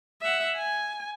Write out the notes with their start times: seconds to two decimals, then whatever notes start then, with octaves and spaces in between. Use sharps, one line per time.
0.22 E5 F#5
0.56 G#5